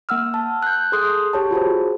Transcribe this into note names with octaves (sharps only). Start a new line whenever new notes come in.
A#3 F#5 E6 F6
A5
F#6 G6
G#4 A4 C6 D#6
G4 C#5 A5
F4 F#4 G#4 C5